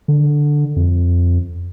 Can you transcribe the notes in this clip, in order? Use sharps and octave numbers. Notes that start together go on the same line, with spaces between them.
D3
F2